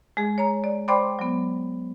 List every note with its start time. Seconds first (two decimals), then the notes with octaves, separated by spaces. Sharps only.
0.17 G#3 G#4
0.38 C#5 A#5
0.64 D5
0.88 C5 D5 G5 B5 C6 D6
1.19 F#3 B3